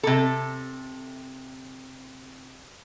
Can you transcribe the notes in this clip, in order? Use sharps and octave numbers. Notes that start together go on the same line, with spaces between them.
C3 A4